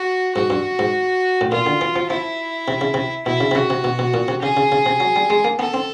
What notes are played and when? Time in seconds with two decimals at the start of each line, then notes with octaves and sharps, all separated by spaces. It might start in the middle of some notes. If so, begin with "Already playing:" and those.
Already playing: F#4
0.35 G#2 F#4
0.50 G2
0.79 G#2
1.41 A2
1.52 A#2 F4
1.66 D3
1.81 E3
1.96 F3
2.09 F3 E4
2.68 C3
2.81 C#3
2.94 C3
3.26 B2 E4
3.41 C#3
3.51 C3
3.55 C#3 F#4
3.70 C3
3.84 B2
3.99 B2
4.14 A#2
4.28 C3
4.42 C#3 G#4
4.57 C#3
4.72 C#3
4.86 C3
5.00 F#3
5.16 G3
5.30 G#3
5.45 A#3
5.59 B3 A4
5.74 C4